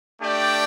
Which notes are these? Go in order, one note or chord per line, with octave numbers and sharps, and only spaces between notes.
A3 D4 G4 D5 G5